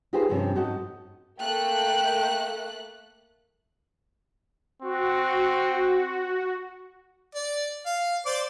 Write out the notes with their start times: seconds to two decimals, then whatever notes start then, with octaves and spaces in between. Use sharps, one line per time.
0.13 D#4 F4 G4 G#4 B4 C5
0.29 G2 C3 F3 C4 C#4
0.55 G#2 F#4 A4 D#5
1.40 A3 A#3 G5 F#6
4.82 C4 F#4
7.35 D5
7.86 F5
8.26 C5 D5 D6